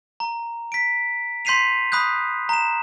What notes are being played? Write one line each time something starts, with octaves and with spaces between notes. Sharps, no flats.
A#5
B6 D7
C6 G6 B6 C7 D#7 F7
B5 D#6 F#6 G6
A#5 E7